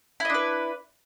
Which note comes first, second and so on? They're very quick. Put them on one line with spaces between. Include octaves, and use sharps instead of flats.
E4 D#5 D4 B4